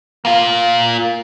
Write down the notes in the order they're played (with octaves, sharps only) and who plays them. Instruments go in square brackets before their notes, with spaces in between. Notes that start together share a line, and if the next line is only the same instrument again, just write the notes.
[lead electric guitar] A#3 F4